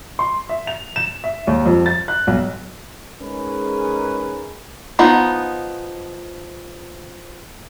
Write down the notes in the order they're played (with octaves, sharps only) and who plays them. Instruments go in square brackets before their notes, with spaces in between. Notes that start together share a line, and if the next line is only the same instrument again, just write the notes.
[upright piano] C6
E5
F7
E7
E5
D#2
F2
A6
F#6
B1
[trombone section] G#3 C#4 D#4 G#4 A#4 B4
[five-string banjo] F3 B3 D#4